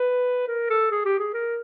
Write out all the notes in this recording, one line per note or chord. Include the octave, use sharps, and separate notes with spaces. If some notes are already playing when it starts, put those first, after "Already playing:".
Already playing: B4
A#4
A4
G#4
G4
G#4
A#4